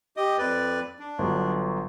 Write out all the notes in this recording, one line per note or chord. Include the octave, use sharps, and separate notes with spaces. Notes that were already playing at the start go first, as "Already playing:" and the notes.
G4 D#5
F2 B4 D5
D4
G1 F#3